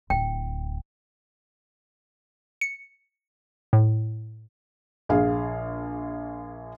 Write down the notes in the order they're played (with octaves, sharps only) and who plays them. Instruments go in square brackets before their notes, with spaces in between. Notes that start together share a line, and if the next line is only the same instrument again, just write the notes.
[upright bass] D1 [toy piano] G5
[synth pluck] C#7
A2
[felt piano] A#1 G#4 F5